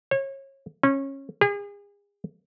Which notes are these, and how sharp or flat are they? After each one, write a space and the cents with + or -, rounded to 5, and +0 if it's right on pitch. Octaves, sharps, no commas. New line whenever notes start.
C#5 -30
C#4 -20
G#4 -40